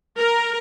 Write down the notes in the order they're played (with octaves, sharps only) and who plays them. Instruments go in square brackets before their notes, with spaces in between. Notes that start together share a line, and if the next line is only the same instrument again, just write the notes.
[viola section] A#4